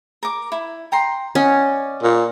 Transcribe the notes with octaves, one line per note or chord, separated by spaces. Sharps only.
A#4 D6
E4
G5 A#5 C6
C#4 D5 D#5 F#5
A#2